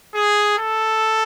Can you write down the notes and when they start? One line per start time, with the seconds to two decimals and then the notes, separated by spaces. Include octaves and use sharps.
0.14 G#4
0.58 A4